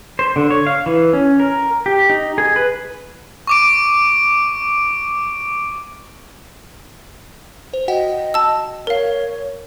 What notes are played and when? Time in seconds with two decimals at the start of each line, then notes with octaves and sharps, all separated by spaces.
0.19 C5
0.36 D3
0.51 C#5
0.67 F5
0.86 E3
1.13 C#4
1.40 A#4
1.86 G4
2.10 D#4
2.38 G#4
2.56 B4
3.47 C#6 D6 D7
7.74 C5
7.88 F#4 D#5 F#5 G5
8.34 A5 E6
8.87 A#4 C#5 F5